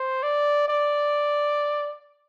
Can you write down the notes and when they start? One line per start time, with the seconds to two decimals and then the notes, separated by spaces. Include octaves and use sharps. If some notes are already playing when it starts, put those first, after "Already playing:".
Already playing: C5
0.23 D5
0.68 D5